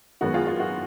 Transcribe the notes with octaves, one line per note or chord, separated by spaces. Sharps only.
F#2 D#3 G#3 B3 F#4
F4 G#4
F4
F#4